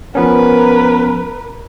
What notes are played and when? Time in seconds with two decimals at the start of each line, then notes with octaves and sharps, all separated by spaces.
0.15 F3 B3 C#4 A#4 B4